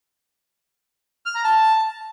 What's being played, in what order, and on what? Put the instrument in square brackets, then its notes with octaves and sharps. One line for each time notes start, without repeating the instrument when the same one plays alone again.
[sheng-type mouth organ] F6
A#5
A5